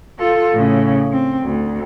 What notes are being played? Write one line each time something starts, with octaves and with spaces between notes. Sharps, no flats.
F4 A4
A2 C#3
C4
D2